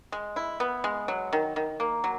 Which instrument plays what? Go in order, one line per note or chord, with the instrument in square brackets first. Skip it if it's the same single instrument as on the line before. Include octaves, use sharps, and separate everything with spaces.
[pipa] G#3
E4
B3
G#3
F#3
D#3
D#3
A#3
F#3